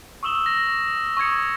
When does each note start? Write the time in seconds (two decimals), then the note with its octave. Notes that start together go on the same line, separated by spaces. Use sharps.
0.23 C#6 D#6 E6 E7 G7
0.46 A#6
1.17 C#6 D#6 G#6 C#7